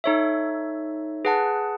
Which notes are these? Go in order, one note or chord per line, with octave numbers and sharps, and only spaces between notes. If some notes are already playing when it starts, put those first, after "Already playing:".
D#4 A4 C#5 E5
G#4 B4 F#5 A5